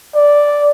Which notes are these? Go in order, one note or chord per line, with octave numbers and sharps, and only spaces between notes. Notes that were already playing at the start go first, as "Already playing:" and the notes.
D5